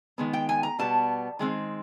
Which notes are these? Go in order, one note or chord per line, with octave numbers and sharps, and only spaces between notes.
D#3 G#3 B3
G5
G#5
A#5
B2 G3 B3 A5
D#3 G#3 C4